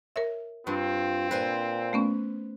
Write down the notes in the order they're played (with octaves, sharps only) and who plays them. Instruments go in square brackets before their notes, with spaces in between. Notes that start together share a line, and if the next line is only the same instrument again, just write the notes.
[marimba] A#4 C#5 E5
[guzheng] G2 [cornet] C4 [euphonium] F4
[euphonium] A#2 [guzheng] B4 C5 G#5
[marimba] A3 B3 C#4